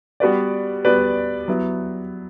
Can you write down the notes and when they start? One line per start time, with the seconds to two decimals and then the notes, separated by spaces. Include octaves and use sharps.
0.20 G3 B3 F#4 B4 D5
0.85 G3 B3 F#4 B4 D5
1.48 F#3 B3 E4